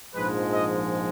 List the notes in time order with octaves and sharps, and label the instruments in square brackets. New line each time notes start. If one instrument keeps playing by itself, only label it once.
[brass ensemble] A#1 G#2 F3 G#3 B4
D#5